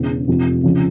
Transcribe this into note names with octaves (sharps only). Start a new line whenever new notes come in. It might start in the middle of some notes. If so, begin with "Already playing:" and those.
Already playing: E1 E2 C#3
F1 F2 C3 F3
C#2 C#3 F3